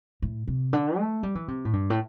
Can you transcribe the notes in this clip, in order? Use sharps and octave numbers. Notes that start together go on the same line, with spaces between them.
A2
C3
D3
A3
G3
E3
C3
A2
G2
A2